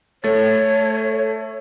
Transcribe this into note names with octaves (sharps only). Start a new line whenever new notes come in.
A3 C#5 A6